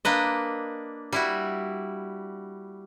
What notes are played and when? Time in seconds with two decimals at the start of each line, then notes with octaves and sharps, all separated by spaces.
0.05 A#3 D4 B4 D#5
1.13 G3 E4 F#4